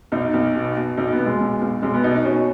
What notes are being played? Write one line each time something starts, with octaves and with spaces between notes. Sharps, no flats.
B1 D#4
B1
B2
B2
B1 D#4
B3
B1
G#3
B1
B1
B1 G#3
B3
B2 D#4
D#4
B2 C#4